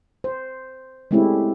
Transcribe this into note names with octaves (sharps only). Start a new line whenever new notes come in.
C5
G#3 A3 C4 C#4 E4 G4